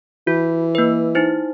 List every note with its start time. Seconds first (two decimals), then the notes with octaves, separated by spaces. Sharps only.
0.27 E3 F#4
0.75 A#3 B4
1.15 D#4 E4 C5